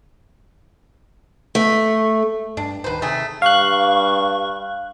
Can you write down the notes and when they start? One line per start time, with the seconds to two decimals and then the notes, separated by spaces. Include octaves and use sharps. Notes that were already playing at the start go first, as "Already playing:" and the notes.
1.55 A3
2.57 G2 D4
2.84 D1 D#3 B4 C5
3.02 C3 D#3 A3 G#4
3.42 G2 F5 C#6 F#6